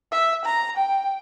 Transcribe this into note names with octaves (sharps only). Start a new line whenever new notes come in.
E5
A#5
G5